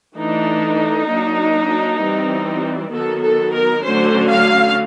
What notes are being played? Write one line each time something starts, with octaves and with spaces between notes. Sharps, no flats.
E3 A3 D4 D#4
F#3 A#3 D4
E3 G3 C4
D#3 F#3 B3 A4
A4
A#4
D3 F#3 A3 C#4 C5
F5